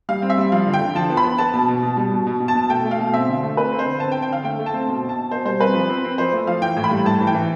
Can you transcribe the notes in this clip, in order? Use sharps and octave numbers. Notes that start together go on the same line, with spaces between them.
G3 F5
C4
E5
G3
F3 F5
D3
G5
D3
F3 A5
B3
B5
B3
B3 A5
B2
B2
B2
G3
B2
B2
B2
A5
B2
A3 G5
A3
F5
B2
C4 E5
D3
A3
C4 B4
C4
C5
D3
C4 A5
G5
C4
G5
D3 F5
A3 G5
A3
A5
C4
B2
B2
A5
B2
B2 C5
G3 C5
C4 B4
F3
C4
C4
F3 C5
A3
F3 F5
E3 G5
A2
B5
G3
A2 A5
E3
G5
E3